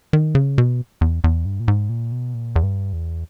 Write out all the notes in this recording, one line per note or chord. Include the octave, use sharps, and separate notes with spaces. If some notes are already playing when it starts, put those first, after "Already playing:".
D#3
C#3
B2
E2
E2
G2
A#2
G#2
A#2
B2
A#2
E2
G2
E2